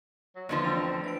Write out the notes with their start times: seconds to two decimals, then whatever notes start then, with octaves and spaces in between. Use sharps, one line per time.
0.35 F#3
0.49 E2 D3 E3 F3 A#3 A#5
0.64 A3 C4 D4 F7
1.04 E3 A#6 D7